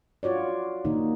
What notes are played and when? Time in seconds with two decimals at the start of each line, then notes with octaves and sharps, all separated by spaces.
0.23 F4 F#4 C#5 D5
0.85 A#2 D#3 A#3 D#4